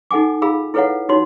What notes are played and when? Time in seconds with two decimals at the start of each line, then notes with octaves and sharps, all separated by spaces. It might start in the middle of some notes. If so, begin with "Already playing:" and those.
0.11 D#4 A4 F#5 G#5 D6
0.42 F4 G#4 F5 B5 E6
0.74 E4 A4 B4 C#5 F5 F#5
1.09 D#4 F4 F#4 C#5 C6